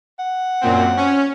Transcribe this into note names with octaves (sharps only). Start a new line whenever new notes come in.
F#5
F#2 A#2 C4
C#4